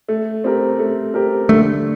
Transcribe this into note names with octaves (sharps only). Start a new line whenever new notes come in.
A3
C4 G4 A#4
A3
C4 G4 A#4
D3 A3